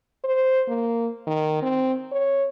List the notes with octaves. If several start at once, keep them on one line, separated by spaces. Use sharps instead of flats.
C5
A#3
D#3
C4
C#5